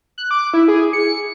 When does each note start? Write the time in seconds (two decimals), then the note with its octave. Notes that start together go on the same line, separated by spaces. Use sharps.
0.18 F#6
0.31 D6
0.54 E4
0.68 G#4
0.93 C#7